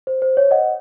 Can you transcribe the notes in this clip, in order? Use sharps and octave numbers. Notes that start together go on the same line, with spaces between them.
C5
C5
C#5
D#5 F#5